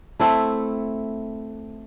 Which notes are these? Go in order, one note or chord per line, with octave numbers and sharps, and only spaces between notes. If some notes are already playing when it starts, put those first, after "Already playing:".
A3 C4 E4 A4